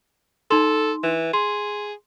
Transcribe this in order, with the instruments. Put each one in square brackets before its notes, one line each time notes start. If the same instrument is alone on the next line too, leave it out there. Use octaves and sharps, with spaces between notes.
[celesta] D#4 C6 [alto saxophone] A4
[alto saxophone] E3
[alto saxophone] G#4 [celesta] C6